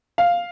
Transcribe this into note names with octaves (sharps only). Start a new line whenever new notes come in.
F5